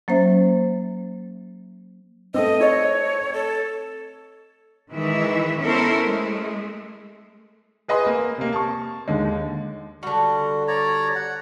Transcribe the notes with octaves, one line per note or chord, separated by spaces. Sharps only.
F#3 A#3 C#4 C5 E5
A3 C4 B4 D#5 D#6
D#4 G#4 C#5 D#5
A4
D#3 E3 G#3 E4 E5
B3 C#4 E4 A4 A#4 C5
G#3 A3
G#4 B4 D#5 G#5 C6 D#6
A#3
C3 A#3
A5 C#6
D#2 D3 G#3
D3 G3 F#4
C#5 D5 A#5
F#5